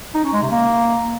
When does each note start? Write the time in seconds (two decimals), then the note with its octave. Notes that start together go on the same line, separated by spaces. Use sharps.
0.15 D#4
0.24 C#4
0.33 G#3
0.42 C3
0.51 A#3